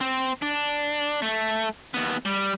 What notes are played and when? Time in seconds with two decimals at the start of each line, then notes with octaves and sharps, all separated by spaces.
0.01 C4
0.42 D4
1.22 A3
1.94 D#2 B3
2.26 G3